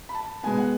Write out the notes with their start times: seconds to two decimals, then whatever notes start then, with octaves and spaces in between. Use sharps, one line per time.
0.09 B5
0.15 A5
0.43 B2 G#3 B3 G#5
0.58 F#5